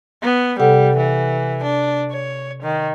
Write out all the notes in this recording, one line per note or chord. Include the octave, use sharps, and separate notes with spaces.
B3
C3 G3 A4 F#5
E3
D4
C#5
D#3